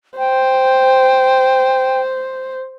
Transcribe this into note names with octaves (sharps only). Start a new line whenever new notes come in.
C5 G5